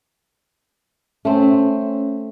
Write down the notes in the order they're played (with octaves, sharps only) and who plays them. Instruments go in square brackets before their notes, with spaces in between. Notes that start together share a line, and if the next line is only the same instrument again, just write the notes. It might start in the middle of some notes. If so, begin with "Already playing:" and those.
[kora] A3 C4 [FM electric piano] C#4